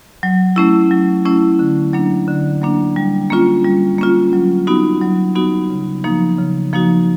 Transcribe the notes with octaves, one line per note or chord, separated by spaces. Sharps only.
F#3
A3 C#4 E4
F#3
A3 C#4 E4
D3
F#3 A#3 D4
D3
F#3 A#3 D4
G3
A#3 C#4 F4
G3
A#3 C#4 F4
F#3
B3 D#4 F#4
F#3
B3 D#4 F#4
C#3
F3 A#3 D#4 F#4
C#3
F3 A#3 D#4 F#4